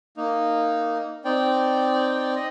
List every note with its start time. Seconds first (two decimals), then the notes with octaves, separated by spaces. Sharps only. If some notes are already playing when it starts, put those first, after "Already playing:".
0.17 A#3 D#4
1.25 C4 D#4 D5 G5
2.36 D#5